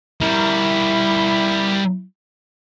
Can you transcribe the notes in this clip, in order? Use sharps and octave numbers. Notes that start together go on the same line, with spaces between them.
G3 E4 A#4